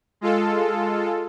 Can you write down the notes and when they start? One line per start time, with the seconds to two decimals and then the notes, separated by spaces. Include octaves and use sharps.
0.21 G#3 F4 A4